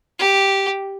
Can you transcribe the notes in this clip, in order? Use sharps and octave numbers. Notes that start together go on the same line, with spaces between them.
G4